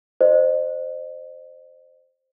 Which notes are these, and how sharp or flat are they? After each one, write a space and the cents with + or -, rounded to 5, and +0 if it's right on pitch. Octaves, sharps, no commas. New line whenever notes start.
C5 +0 D#5 -40